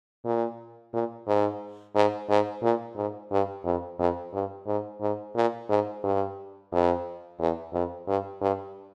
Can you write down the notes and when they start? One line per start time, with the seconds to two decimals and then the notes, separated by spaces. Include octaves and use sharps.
0.25 A#2
0.93 A#2
1.27 G#2
1.95 G#2
2.29 G#2
2.63 A#2
2.96 G#2
3.32 G2
3.65 F2
3.99 F2
4.33 G2
4.67 G#2
5.01 G#2
5.36 A#2
5.69 G#2
6.04 G2
6.72 F2
7.40 E2
7.73 F2
8.07 G2
8.41 G2